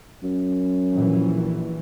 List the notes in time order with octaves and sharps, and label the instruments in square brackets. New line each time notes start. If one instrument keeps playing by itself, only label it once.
[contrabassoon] F#2
[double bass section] A#1 E3